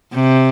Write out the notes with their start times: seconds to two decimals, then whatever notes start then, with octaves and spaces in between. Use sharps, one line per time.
0.15 C3